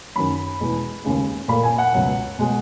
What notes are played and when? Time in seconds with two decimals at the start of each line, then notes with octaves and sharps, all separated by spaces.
0.16 F#2 D#3 F#3 B5
0.60 E2 B2 G#3
1.04 D#2 C#3 G#3
1.48 A#2 A#3 B5
1.63 G#5
1.78 F#5
1.93 C#2 B2 F#3
2.38 B2 G#3